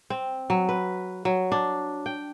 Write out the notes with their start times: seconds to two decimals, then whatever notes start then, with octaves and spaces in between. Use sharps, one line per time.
0.10 C4
0.50 F#3
0.69 B4
1.25 F#3
1.52 D4
2.06 G5